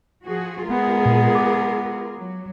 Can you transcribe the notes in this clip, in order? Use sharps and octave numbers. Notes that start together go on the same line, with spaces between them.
F3 F#4 G#4
G#3 B3 F4 G#4 A#4
A#2
D6
F#3